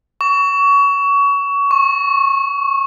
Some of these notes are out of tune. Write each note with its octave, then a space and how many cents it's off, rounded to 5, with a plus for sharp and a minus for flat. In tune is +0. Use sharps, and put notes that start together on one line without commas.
C#6 +25
C#6 -25